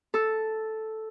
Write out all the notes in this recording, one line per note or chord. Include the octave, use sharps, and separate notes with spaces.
A4